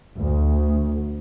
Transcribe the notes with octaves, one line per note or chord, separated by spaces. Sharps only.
D2